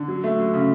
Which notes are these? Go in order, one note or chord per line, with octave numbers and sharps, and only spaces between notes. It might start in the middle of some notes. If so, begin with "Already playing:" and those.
Already playing: D3
F#3
A3
F#3
C#3